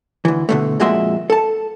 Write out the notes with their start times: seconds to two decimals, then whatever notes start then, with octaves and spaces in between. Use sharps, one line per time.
0.25 D2 E3
0.49 B2 D3 A3
0.80 F2 A#2 G#3 F#4 E5 C6
1.30 A4 A5